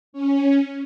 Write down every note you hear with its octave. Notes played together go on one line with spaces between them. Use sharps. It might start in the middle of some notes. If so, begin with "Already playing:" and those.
C#4